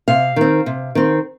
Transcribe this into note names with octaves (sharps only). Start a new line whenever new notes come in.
C3 F5
D#3 C4
C3
D#3 C4